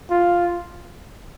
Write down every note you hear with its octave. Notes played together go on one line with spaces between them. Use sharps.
F4